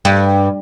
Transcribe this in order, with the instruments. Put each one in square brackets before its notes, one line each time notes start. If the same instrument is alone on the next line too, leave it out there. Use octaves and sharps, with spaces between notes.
[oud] G2